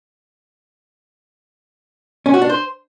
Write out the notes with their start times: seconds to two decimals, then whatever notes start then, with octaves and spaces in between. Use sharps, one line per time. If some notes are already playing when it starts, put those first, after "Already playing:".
2.26 C#4
2.34 F#4
2.42 D4
2.49 C5